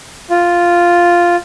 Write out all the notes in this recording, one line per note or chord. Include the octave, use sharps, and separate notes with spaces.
F4